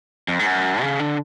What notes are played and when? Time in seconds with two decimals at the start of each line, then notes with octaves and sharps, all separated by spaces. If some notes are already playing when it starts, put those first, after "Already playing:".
0.28 F2
0.39 G#2
0.46 F#2
0.81 C#3
0.99 D3